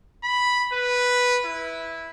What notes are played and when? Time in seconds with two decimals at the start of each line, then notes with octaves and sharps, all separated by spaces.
0.24 B5
0.73 B4
1.46 E4